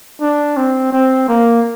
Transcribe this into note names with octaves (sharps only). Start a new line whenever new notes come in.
D4
C4
C4
A#3